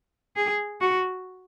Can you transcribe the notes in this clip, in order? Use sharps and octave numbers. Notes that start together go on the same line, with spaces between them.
G#4
F#4